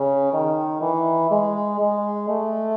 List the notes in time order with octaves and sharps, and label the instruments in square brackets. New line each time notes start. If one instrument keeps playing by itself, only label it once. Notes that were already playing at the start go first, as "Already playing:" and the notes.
Already playing: [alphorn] C#3
D#3
E3
G#3
G#3
A3